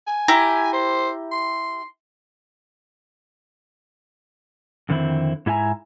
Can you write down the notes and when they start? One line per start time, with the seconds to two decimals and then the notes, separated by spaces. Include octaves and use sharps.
0.07 G#5
0.28 E4 G4 A#5
0.73 C5
1.31 C6
4.89 F2 D3 D#3 C4 E4
5.46 G#2 E4 E5 G#5 A#5